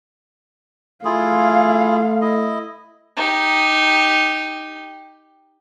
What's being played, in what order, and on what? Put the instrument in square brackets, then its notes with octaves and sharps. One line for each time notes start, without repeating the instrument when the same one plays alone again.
[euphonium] A3 [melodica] E4 F4 G#4 [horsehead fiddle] F5
[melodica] E4 D#5
[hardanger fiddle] D#4 G4